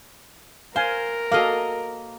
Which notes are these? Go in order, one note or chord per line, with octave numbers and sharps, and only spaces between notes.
A#4 C5 F5 G#5
A#3 F#4 A4 D#5 F5